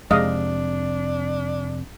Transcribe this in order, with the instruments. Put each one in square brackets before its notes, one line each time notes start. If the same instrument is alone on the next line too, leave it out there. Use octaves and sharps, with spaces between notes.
[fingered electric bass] F2 C3 [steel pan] G#3 D#5 F5 [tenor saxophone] D4